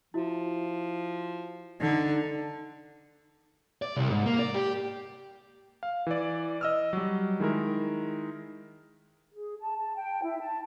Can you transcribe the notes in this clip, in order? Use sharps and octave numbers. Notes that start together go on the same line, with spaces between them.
F3 E4 F#4 E5
D3 D#4
D5
C2
G#2
A#3
D5
G4
F5
E3 D5
D#5 E6 F6
F#3 G3
D#3 G#3 E4 A#4
G#4
A5
A5
G5
E4
A5